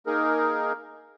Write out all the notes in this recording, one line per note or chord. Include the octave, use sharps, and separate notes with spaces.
A#3 D#4 G#4 A#4